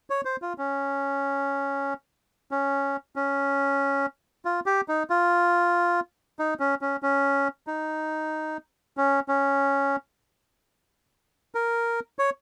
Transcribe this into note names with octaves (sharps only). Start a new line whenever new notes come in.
C#5
C5
F4
C#4
C#4
C#4
F4
G4
D#4
F4
D#4
C#4
C#4
C#4
D#4
C#4
C#4
A#4
C#5